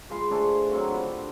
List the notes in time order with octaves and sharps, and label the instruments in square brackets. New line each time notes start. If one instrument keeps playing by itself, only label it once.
[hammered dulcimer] G#3 F4 B4 C6
A3 D4 G#4 C5
F#3 A#3 C4 F#4
D4 F4 G4 B4
D3